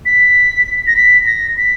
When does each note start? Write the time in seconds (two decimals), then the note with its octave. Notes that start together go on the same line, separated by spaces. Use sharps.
0.06 B6
0.87 A#6
0.97 B6
1.26 A#6
1.57 B6